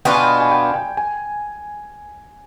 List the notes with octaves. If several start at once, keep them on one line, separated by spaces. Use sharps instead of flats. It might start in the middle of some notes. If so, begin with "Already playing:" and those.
B2 B3 D4 F4 G5
G#5
G5
G#5
G5
G5
G#5